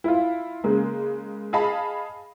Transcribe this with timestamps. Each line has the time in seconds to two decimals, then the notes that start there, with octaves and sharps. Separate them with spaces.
0.04 E4 F4
0.64 C#3 G#3 A#3
1.53 G#4 D#5 F5 A5 B5